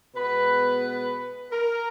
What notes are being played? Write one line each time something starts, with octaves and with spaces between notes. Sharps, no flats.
B2 G#3 B3 B4
A#4